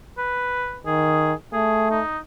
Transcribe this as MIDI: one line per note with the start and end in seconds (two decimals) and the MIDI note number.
0.18 0.78 71
0.86 1.33 51
0.86 1.32 68
1.53 2.00 57
1.53 1.86 68
1.91 2.18 63